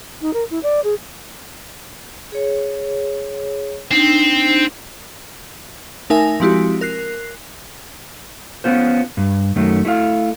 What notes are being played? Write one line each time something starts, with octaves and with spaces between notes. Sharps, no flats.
D#4
A#4
E4
D5
G#4
G#4 C#5
C4 D4 D#4
A3 D#4 A#4 E5 G#5 A#6
F3 G#3 C4 E4 F#4 G4
A#4 F#6 C7
B3 C#4 F4 C5
G2
F#2 D#3 A3 C#4
A3 E4 D#5 F5